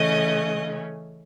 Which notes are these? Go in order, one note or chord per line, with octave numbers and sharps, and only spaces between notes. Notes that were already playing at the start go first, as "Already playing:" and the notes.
Already playing: C#3 E3 A3 C#4 D#5